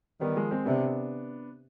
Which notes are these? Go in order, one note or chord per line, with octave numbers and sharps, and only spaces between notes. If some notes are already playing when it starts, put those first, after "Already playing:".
D#3 G3 B3
F3 G#3
G#3 C4
C3 B3 D4